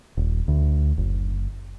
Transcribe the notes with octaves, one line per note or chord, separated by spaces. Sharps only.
D#1
D2
F#1